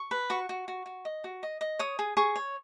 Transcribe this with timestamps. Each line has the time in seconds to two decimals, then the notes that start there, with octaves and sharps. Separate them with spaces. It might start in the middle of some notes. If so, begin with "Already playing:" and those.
Already playing: C#6
0.11 B4
0.30 F#4 C#6
0.49 F#4
0.68 F#4
0.86 F#4
1.05 D#5
1.24 F#4
1.43 D#5
1.61 D#5
1.79 C#5 D#6
1.99 G#4
2.17 G#4 C#6
2.36 C#5